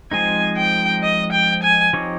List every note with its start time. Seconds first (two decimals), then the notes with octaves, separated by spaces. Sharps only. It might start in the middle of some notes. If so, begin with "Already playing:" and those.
0.11 F3 G#3 C4 D#4 G#5
0.57 G5
1.03 D#5
1.32 G5
1.63 G#5
1.93 F3 C4 D#4 G4 C#5